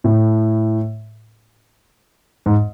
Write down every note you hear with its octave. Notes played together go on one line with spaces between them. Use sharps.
A2
G#2